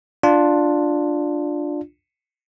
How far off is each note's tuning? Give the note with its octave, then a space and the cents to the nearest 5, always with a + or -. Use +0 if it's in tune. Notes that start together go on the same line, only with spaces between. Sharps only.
D4 +5 F4 +5